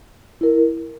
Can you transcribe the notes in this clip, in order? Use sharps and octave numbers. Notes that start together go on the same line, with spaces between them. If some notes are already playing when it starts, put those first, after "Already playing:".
E4 A#4